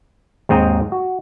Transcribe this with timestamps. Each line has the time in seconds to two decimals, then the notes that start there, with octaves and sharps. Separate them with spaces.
0.49 D#2 G#2 C4 D#5 A#5
0.92 F#4